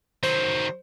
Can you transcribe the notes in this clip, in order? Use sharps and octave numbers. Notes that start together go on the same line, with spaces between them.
D#3 F#3 C5